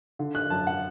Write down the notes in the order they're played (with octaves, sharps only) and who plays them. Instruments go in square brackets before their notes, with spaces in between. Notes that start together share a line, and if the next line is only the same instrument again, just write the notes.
[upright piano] D3
F#6
F#2 A5
F#5